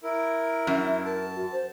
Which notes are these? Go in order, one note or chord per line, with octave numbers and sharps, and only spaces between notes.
E4 A#4
F#2 E5
A#4 A5
F#4
C5